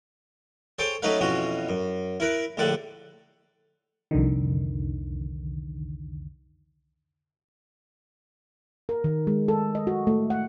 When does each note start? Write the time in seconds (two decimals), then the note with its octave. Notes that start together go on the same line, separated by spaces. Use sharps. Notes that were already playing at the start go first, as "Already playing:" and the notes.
0.79 G#4 A4 C5 C#5 G5
1.02 F#3 A3 C#4 D#4 B4 F5
1.20 F2 B2 E3 C#4 F#4
1.69 F#2
2.20 E4 A#4 B4
2.57 A#1 A2 D3 A4 F#5
4.11 C2 F2 D3 D#3
8.89 A#4
9.04 D#3
9.27 G#3
9.48 A4
9.75 D#5
9.87 F#4
10.07 A3
10.30 F#5